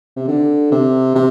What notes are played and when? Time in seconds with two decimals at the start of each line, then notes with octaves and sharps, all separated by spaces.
0.16 C3
0.28 D3
0.72 C3
1.15 C3